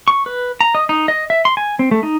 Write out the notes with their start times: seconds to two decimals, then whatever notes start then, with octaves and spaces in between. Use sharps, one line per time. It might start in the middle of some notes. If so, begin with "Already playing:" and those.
0.08 C#6
0.26 B4
0.61 A#5
0.75 D#5
0.89 D#4
1.08 D#5
1.30 E5
1.45 C6
1.57 G#5
1.79 C4
1.91 A3
2.03 D#4